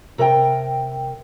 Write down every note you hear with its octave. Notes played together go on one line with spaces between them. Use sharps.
C3 A#4 C#5 G5